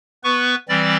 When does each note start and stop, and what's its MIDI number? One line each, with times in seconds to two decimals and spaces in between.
0.24 0.55 59
0.24 0.55 71
0.24 0.55 85
0.69 0.97 52
0.69 0.97 55
0.69 0.97 60
0.69 0.97 74
0.69 0.97 93